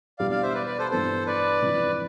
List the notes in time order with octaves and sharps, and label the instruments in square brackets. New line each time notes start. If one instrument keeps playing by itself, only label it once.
[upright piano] E2 B2 G3 B3 D4 [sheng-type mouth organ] D5 F5
[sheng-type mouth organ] D5 F5
C5 E5
B4 D5
B4 D5
A4 C5
[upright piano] G2 E3 B3 D4 [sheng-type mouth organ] A4 C5
[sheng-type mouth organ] B4 D5
[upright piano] F1 F2 E3